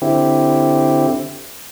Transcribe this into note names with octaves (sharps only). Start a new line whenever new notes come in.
D3 C4 E4 G4